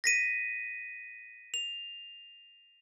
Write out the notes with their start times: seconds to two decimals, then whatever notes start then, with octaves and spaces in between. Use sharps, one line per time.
0.04 A#6 B6 D#7
1.54 F7